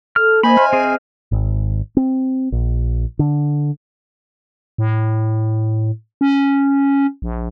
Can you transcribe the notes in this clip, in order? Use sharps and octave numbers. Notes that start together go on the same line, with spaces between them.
A4 F6
A#3 C5 D#5 E5 G#5 B5
C5 F6
C4 G#4
G#1
C4
A#1
D3
A2
C#4
A#1